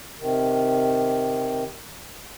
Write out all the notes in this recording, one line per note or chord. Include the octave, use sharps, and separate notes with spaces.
C3 D#3